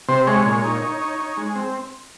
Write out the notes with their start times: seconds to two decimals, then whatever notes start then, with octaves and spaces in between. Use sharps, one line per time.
0.08 C3 C5
0.27 G#3 C#5
0.46 A#2
0.64 D#4
0.82 D#4
1.01 D#4
1.19 D#4
1.37 G#3
1.55 C4